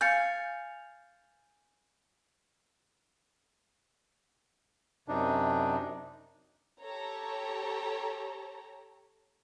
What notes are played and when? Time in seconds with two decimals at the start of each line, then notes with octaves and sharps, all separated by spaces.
0.01 F5 G#5 G6 A6 C#7
5.08 F#2 C3 D4 D#4
6.81 G4 A4 C#5 A#5